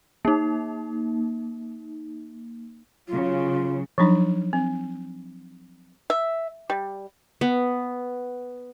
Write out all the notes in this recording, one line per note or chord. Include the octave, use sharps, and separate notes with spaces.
A#3 D#4
C#3 F#3 F4
F3 F#3 D4 D#4
C4
E5
G3
B3